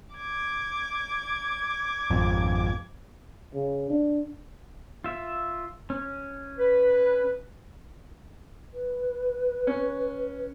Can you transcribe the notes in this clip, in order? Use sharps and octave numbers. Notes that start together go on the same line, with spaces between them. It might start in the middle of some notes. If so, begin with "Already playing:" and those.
D6 G#6
G#1 F2
C#3
D4
F4 E5
C#4
B4
B4
C#4